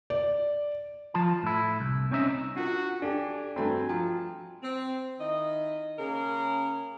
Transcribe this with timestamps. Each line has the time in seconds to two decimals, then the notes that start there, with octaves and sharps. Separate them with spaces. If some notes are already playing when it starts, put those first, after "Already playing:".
0.10 D5
1.14 F3 F4 A5
1.43 A2 E4
1.80 C2
2.11 C4 C#4 D#4 E5
2.56 D4 F4 F#4 A#4
3.02 D4 G4 A4 G#5
3.56 G2 A3 C4 F#4 A#5 B5
3.89 F3 G5 A#5
4.63 C4
5.20 D#3 D#4 E4 D#5
5.99 C#3 A#3 C#4 G#4 A#4